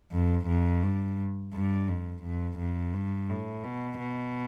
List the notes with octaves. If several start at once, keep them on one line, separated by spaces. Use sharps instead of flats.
F2
F2
G2
G2
F2
F2
F2
G2
A2
B2
B2